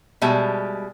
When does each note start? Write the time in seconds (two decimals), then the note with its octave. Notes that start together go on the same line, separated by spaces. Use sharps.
0.22 B2 G3 G#3 E5 A5